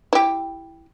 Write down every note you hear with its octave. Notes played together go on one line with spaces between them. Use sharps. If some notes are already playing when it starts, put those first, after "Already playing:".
E4 G4